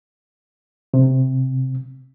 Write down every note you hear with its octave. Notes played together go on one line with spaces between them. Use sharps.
C3